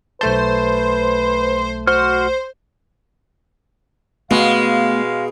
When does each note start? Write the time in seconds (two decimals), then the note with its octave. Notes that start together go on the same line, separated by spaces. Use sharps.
0.21 B1 A3 B4 C5 A5
1.87 F#4 C5 F6
4.31 B2 G#3 A3 B3 F5